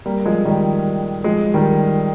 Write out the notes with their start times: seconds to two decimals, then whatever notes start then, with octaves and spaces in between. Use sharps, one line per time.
0.06 G3 A#3
0.26 F3 G#3
0.45 D#3 G3
1.24 F3 G#3
1.54 D#3 G3